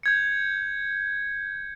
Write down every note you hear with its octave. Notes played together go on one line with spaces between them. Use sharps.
G6 G#6 C#7